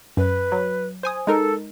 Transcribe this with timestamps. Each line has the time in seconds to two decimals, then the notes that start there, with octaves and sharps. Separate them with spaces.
0.17 F#2 B4
0.52 F#3
1.03 C5 G#5 D#6
1.27 G#3 D#4 A4 A#4